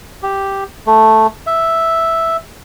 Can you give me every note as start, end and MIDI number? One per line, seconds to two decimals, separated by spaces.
0.23 0.64 67
0.86 1.27 57
1.47 2.37 76